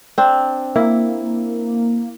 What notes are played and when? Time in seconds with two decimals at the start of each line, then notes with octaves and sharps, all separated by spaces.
0.18 C4 D4
0.76 A#3 E4